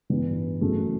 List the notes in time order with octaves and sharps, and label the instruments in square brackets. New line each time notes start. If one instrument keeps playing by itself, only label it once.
[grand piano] A1 G2 E3 B3 D4
F#1 F#2 C#3 E3 A3